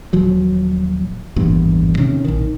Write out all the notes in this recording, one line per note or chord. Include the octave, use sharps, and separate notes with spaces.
D#1 F3 F#3
G#1 E2 G2 A#2
C3 D#3 C#4
A#1 D#3